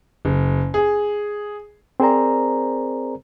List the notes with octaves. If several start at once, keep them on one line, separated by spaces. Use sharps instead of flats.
F#1
G#4
C4 G#4 A#4 C5 D5 A#5